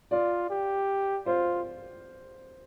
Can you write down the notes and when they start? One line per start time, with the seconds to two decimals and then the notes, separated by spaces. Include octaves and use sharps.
0.11 F4 D5
0.50 G4
1.26 F4 C5